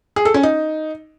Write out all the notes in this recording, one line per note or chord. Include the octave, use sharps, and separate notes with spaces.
G#4
A4
C#4
D#4